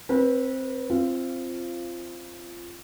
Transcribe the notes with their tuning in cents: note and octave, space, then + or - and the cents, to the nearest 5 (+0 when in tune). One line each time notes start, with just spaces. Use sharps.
C4 +10 B4 -25
C4 +10 F4 -20